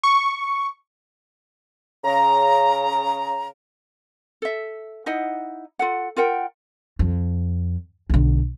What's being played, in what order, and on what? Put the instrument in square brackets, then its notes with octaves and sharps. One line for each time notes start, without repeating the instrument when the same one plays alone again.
[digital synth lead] C#6
[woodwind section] C#3 A#5
[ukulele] A4 E5
D#4 E4 D#5 F#5
F4 A4 F#5
F4 A#4 F#5 G5
[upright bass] F2
B1 D3